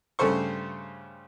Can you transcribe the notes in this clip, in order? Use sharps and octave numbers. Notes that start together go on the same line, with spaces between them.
G2 C#3 A3 A4 C5 C#6